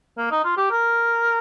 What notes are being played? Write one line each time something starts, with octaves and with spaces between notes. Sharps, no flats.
A#3
D#4
F4
G4
A#4